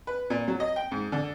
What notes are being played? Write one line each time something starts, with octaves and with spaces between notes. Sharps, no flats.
B4
A#2
F#3
D#5
G5
G#2
D3